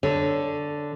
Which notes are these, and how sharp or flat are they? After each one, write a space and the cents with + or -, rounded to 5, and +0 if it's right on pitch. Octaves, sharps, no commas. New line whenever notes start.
D3 +0 C#5 +0